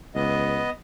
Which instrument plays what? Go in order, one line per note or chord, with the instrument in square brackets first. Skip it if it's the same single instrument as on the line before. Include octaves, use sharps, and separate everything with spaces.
[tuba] C#2 [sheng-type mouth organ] B3 D#5